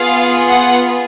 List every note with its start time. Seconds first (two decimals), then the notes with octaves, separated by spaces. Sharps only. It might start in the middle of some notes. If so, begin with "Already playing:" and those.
Already playing: B3 F4 G#4 F5
0.49 F#5